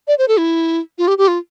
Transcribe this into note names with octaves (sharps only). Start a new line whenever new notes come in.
D5
C5
A4
E4
F4
G4
G4
F4